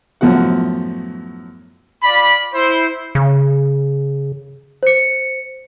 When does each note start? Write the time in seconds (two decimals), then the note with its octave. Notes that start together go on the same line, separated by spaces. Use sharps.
0.21 F#2 A2 F3 B3 F#4 F#5
2.03 F4 D5 B5
2.54 E4 C5
3.15 C#3
4.83 C5 C#7